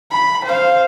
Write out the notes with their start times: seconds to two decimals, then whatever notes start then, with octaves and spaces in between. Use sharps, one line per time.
0.11 B5
0.44 C5 F5